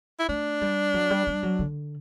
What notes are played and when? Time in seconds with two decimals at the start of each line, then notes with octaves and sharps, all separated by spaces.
0.19 E4
0.29 A3 D4
0.61 G3
0.94 F#3
1.10 G3
1.27 G3
1.43 F#3
1.59 D3